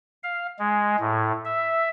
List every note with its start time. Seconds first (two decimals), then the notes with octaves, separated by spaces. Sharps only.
0.23 F5
0.59 G#3
1.00 A2
1.45 E5